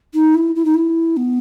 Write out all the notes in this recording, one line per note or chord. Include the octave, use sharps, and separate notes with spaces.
D#4
E4
E4
D#4
E4
B3